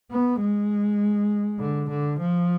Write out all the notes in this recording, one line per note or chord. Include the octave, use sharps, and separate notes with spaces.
B3
G#3
D3
D3
F3